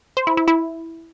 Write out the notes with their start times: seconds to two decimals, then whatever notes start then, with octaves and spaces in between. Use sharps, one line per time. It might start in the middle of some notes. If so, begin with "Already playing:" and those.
0.17 C5
0.27 E4
0.37 E4
0.48 E4